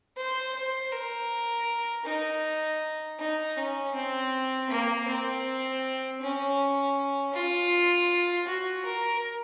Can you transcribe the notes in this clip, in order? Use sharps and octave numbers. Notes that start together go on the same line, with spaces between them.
C5
C5
A#4
D#4
D#4
C#4
C4
A#3
C4
C#4
F4
F#4
A#4